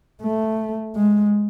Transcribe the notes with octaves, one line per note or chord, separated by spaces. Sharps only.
A3
G#3